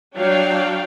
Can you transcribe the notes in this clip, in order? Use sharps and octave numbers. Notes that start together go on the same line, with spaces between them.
F#3 D4 C#5 D5 F5 G5